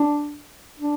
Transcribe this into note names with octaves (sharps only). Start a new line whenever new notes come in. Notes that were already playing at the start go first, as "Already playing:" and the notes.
Already playing: D4
D4